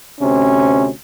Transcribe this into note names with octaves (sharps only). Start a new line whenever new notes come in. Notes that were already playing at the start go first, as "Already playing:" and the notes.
D2 C3 C#4